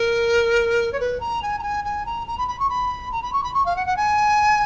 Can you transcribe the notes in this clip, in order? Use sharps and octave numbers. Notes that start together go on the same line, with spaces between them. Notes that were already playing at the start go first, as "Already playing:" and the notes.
Already playing: A#4
C#5
B4
A#5
G#5
A#5
G#5
G#5
A#5
A#5
B5
B5
C#6
B5
A#5
B5
C#6
B5
C#6
F5
F#5
F#5
G#5